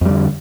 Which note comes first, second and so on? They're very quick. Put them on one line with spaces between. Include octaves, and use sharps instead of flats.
F2 G3 D3